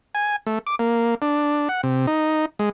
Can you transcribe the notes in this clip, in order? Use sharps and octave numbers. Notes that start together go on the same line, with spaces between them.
G#5
A3
D6
A#3
D4
F#5
C3
D#4
G#3